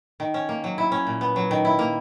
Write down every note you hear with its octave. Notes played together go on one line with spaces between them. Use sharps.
D#3
C#4
A#3
F#3
E4
C#4
A#2
B3
F#3
D#3
E4
A#3